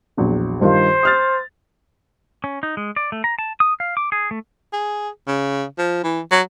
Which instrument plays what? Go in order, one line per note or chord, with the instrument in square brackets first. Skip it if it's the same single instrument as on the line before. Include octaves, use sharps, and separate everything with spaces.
[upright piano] A#1 E2 F#3
[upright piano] G2 D#3 F4 [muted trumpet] C5
[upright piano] D#6 F6 A6
[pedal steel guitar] C#4
D#4
G#3
D5
A3
A#5
A5
D#6
F5
D6
G#4
A3
[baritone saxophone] G#4
C#3
F3
E3
F#3